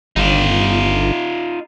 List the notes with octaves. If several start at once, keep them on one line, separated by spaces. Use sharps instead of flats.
G1 D#4 F4